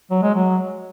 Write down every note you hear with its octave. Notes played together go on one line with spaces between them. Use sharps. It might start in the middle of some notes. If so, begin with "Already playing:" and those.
F#3
G#3
F#3